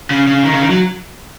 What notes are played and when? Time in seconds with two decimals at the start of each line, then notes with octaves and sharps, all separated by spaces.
0.11 C#3
0.27 C#3
0.44 D#3
0.53 C#3
0.62 D#3
0.70 F#3